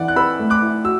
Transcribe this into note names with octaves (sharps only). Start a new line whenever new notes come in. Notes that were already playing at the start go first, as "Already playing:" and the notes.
Already playing: E3 D5 F#5
F#6
B4 B5 E6
A3
D6 F#6
E4
F#4 E6